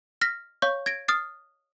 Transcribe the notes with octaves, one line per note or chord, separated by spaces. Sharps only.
F6 A#6 B6
C#5 F5 C#6 G6
G#6 A#6 D7
D#6 F6 A6 C7